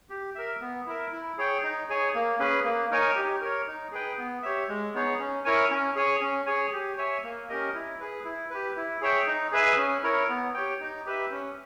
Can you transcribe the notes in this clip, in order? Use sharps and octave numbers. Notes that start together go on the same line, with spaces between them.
G4
A#4 E5
B3
E4 A#4 E5
E4
G#4 C#5 G5
D#4
G#4 C#5 G#5
A#3
C#4 G#4 B4
A#3
D#4 A#4 C#5 G#5
G4
A#4 C#5
D#4
G#4 B4 G5
B3
G4 C#5 E5
G#3
B3 D#4 G#4 C#5
C#4
E4 A#4 C#5 G#5
C#4
G#4 C#5 G#5
C#4
G#4 C#5 G#5
G4
C#5 E5 G#5
A#3
C#4 G4 A#4 D#5
E4
G#4 B4
E4
G4 B4
E4
G#4 C#5 E5 G5
D#4
G#4 B4 E5 G#5
C#4
E4 A#4 C#5
B3
G4 C#5 G5
D#4
G4 B4 E5
C#4